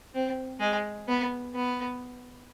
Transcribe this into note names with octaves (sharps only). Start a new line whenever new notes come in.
C4
G#3
B3
B3